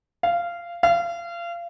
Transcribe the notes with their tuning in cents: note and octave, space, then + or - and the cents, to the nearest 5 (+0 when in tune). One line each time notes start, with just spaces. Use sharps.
F5 -15
F5 -30